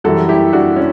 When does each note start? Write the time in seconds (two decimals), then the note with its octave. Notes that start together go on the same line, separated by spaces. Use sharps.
0.04 F#2 E3 G3 F#4 A4
0.29 E4 G4
0.53 D4 F#4
0.76 C#4